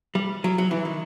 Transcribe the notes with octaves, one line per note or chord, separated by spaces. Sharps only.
G3
F#3
F#3
E3
D#3